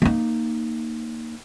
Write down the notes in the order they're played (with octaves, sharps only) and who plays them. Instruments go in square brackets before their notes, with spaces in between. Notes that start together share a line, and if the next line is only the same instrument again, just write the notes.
[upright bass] A#3 D#4